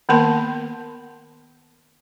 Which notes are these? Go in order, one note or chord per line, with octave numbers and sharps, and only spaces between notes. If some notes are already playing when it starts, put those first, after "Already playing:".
D#3 A#3 B3 A#4 A5 C6